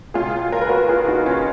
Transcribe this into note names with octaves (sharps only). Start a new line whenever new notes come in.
C#2 B2 F4 G#4
A#4
B4
F#4 A#4
F4 G#4
D#4 F#4
C#4 F4